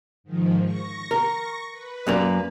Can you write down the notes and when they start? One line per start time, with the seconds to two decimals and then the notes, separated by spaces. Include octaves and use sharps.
0.24 G#2 D#3 F3
0.63 C#6 A#6
1.11 A#4
1.71 B4
2.07 F#2 A#3 D5